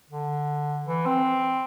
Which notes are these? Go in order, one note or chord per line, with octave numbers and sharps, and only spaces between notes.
D3
E3
C4